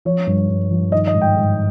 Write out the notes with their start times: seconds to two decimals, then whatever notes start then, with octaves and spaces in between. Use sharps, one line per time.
0.05 F3 C#5
0.27 G2
0.49 G2
0.71 F3
0.92 D#3 D#5
1.07 D#5
1.15 G#2
1.21 G5
1.37 G#2